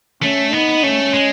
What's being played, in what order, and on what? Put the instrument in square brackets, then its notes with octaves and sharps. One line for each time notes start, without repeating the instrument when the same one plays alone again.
[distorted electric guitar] A3 [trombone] C#4
[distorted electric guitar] B3 [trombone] D#4
[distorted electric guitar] A3 [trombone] C#4
[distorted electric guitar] G#3